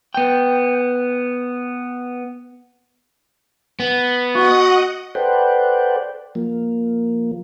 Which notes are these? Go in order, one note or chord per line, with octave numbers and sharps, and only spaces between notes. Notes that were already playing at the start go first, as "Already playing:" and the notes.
B3 G5
B3
F#4 D#5 F#5 D#6
A4 B4 C5 D5 F#5 G5
F3 A#3